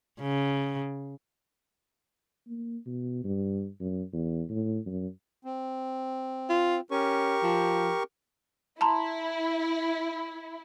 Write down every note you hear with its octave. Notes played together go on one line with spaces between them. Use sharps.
C#3
A#3
B2
G2
F#2
E2
A2
F#2
C4
F4
C#4 G4 A#4 C#6
F3
E4 A5 A#5 C6